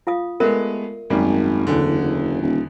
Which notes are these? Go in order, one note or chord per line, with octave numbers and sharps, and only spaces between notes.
F4 F5 D#6
G#3 A3 B3 A#4 D5 E5
G#1 F#2 G3 A#3
F#1 E2 D3
D#1